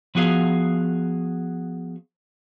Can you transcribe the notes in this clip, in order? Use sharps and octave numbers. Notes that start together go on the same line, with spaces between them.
F3 B3 F#4 G#4 F5